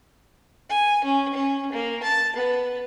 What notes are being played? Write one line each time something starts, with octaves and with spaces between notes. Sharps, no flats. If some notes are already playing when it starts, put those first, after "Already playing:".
G#5
C#4
C#4
A#3
A5
B3